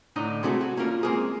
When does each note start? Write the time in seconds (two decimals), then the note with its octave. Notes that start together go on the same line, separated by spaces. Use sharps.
0.16 A2 D3 D#4 D#5 A#5
0.43 C3 G#3 A3 C4 F#4
0.61 F#4
0.77 A#3 C#4 F4 A#4
1.03 G#3 A#3 C4 G#4